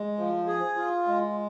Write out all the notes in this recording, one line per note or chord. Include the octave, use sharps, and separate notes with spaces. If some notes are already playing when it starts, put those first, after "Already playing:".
Already playing: G#3
F3
G#4
F4
G#3